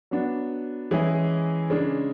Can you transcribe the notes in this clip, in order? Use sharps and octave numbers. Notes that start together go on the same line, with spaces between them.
F#3 B3 D4
E3 G#3 C#4 E4 G#4
C#3 G#3 D4